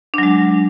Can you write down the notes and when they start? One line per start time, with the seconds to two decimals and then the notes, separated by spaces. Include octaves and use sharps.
0.14 D4
0.18 F#3
0.23 G#3